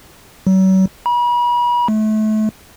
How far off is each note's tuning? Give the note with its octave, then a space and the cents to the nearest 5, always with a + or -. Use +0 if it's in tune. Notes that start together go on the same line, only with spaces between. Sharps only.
F#3 +40
B5 -40
A3 -30